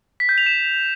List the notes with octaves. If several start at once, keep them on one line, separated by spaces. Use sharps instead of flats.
B6
G6
F7
E7